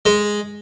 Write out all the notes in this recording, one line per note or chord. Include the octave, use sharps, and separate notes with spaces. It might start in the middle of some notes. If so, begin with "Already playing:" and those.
G#3